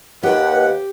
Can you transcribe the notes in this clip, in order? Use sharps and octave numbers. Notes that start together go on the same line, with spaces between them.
D#2 G4 B4 F#5